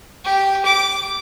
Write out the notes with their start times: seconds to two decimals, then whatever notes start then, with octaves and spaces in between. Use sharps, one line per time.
0.24 G4
0.65 D6